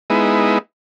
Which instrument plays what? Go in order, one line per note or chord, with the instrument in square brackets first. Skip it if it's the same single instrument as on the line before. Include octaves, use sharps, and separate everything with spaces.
[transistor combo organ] G#3 B3 D#4 E4